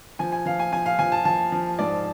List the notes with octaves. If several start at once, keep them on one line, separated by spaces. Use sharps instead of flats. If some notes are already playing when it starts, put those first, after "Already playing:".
F3 G#5
G#5
F3 F5
G#5
F3 G#5
F5
F3 G#5
A5
F3 A5
F3
G#2 D5